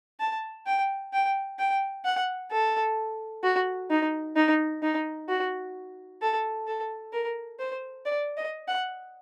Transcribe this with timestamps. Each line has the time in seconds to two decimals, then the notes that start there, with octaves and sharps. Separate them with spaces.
0.20 A5
0.66 G5
1.13 G5
1.59 G5
2.05 F#5
2.51 A4
3.43 F#4
3.90 D#4
4.36 D#4
4.82 D#4
5.28 F#4
6.22 A4
6.67 A4
7.13 A#4
7.59 C5
8.06 D5
8.37 D#5
8.68 F#5